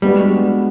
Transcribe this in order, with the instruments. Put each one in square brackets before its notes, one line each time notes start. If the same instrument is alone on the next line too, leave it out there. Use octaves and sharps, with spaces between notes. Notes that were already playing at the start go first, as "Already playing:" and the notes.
[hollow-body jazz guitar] G3 [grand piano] G#3 B3 D4 F#4 B4